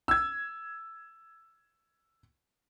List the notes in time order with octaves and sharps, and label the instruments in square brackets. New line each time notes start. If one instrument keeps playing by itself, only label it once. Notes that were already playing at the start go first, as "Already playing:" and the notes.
[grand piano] E6 G#6